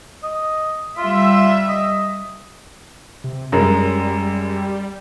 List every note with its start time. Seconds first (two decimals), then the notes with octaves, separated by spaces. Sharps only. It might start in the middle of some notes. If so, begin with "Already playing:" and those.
0.24 D#5
0.98 G3 F4 E5
1.69 D#5
3.24 C3
3.52 F#2 G3 G#3 A#4